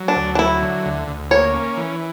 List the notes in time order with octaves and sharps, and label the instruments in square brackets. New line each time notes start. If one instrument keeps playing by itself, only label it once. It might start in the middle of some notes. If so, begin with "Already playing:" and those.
Already playing: [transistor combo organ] F#3
[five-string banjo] D4
[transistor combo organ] D2
[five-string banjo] D4
[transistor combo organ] F#3 [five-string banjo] E4
[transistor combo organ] D3
D2
D2
[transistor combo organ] A#3 [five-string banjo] C#5
[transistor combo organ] C#4
E3